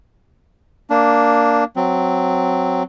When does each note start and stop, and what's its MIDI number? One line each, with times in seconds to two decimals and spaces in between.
0.90 1.64 58
0.90 1.64 62
1.76 2.83 54
1.76 2.83 60